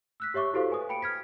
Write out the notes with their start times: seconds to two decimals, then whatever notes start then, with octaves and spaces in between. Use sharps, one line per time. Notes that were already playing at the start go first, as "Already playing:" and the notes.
0.20 E6 F#6 B6
0.34 G4 C#5 E5 C#6 D6
0.53 E4 F#4 G4 A4 C5 F5
0.70 B4 G#5 D#6
0.89 G5 B5 C#7 D7
1.02 F6 G#6 B6